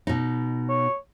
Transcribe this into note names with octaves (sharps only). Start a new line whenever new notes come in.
B2 D#4
C#5